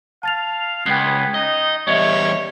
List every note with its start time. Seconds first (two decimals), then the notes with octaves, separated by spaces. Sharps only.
0.23 F5 A5 A6 F7
0.86 C#2 B3 G5 G#6 C7
1.34 D#4 D#5
1.88 E2 G3 C#5 D#5 E5